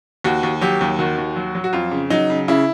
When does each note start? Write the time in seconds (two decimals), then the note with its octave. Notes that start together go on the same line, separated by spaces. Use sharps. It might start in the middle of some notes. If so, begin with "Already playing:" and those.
0.24 D#2 F#4
0.43 D#2
0.61 F#3 G4
0.81 D#2
0.99 D#3 F#4
1.18 D#2
1.36 F#3
1.55 F#3
1.64 F#4
1.73 F2 F4
1.91 C#3
2.10 F#3 D#4
2.30 C#3
2.48 C#3 E4